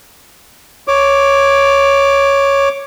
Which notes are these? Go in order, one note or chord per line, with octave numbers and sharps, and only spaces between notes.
C#5 D6